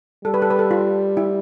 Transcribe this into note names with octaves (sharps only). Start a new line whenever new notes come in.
G3 A4
B4
A4
B4
A4
F4
E4